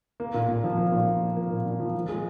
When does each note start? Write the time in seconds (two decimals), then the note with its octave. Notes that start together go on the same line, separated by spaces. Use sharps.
0.20 A#3
0.34 A#2
0.49 A#2
0.64 F3
0.77 A#3
0.92 A#2
1.08 A#2
1.22 F3
1.36 A#3
1.50 A#2
1.66 A#2
1.80 F3
1.95 F3
2.09 G#3